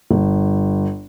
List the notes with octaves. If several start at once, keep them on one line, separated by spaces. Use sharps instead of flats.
G1